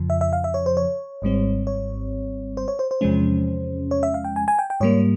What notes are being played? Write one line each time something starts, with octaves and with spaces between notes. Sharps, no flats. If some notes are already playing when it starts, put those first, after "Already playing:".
Already playing: F2 C#3 F3
E5
E5
F5
E5
C#5
C5
C#5
G#1 G#2 G3 C4
C#5
C5
C#5
C5
C5
E2 C3 F3 G#3 C#4
C#5
E5
F5
G5
G#5
G#5
G5
G5
G#2 G3 A#3 C#5